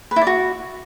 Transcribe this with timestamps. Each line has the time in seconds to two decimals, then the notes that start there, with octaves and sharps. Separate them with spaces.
0.11 B4
0.16 E4
0.21 D5
0.27 F#4